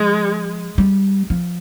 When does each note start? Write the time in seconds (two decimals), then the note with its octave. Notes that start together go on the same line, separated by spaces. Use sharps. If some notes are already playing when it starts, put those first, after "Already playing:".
Already playing: F3 G#3
0.78 G3
1.30 F3